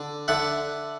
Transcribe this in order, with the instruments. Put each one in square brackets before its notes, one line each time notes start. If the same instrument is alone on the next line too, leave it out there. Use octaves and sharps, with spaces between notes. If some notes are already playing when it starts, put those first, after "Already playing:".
Already playing: [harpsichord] D3
D3 E5 F#5